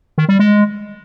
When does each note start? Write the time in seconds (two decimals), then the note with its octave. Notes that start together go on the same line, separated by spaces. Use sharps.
0.18 D#3
0.29 G3
0.39 G#3